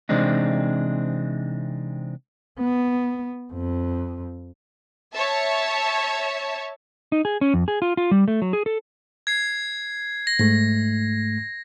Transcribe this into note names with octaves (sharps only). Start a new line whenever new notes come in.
C3 E3 G#3 C4 D4 D#4
B3
F2
C#5 E5 A5
D#4
G#4
C#4
F2
G#4
F4
F4
G3
A3
F#3
G#4
A4
G#6 C7
A#6
G#2 A3 A#6